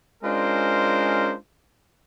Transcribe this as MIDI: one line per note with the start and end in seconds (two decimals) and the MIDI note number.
0.23 1.34 56
0.23 1.34 61
0.23 1.34 62
0.23 1.34 65
0.23 1.34 70
0.23 1.34 72